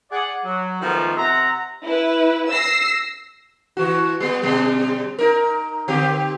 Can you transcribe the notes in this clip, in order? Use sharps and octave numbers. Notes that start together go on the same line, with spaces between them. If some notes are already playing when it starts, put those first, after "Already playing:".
G#4 D5 F#5
F#3
D#3 F3 G#3 A3 B3 D#4
C3 E5 F#5 A#5
E4 B4
E6 A#6 C7
E3 F#4
G3 B3
B2 G3 G#3
D#4 A#4
D3 C4 G4